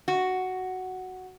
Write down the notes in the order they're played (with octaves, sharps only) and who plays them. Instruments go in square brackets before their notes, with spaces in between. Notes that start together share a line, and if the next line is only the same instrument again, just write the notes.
[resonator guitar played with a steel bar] F#4